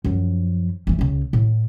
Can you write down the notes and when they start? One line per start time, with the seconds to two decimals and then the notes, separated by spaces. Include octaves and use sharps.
0.04 F#2 F3
0.87 D2 E3
0.99 C#2 C#3
1.33 A2